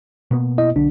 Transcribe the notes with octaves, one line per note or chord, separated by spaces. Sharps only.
B2 A#3 B3
E4 D#5
B1 D3 D4